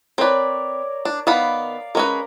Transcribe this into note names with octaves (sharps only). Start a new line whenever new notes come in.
C4 A#4 B4 C#5 D5
D4
D#3 B3 D5 F5 B5
G#3 C#4 A#4 B4